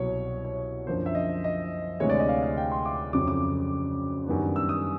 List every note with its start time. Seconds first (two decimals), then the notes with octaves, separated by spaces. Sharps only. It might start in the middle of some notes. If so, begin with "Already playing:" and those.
Already playing: C2 B2 F#3 C#5
0.44 C#5
0.87 F#2 D3 F3 A#3 C5
1.06 E5
1.15 D#5
1.44 D#5
2.00 D2 C3 E3 G#3 C#5
2.10 D5
2.20 D#5
2.29 F5
2.43 F5
2.57 G5
2.71 C6
2.85 D6
3.13 F2 C#3 F#3 D6
3.28 D6
4.26 F#2 D#3 G3 B3 D4
4.56 E6
4.69 D#6